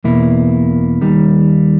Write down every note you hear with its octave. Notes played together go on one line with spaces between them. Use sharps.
E2 B2 A#3 E4
D#2 D#3 G3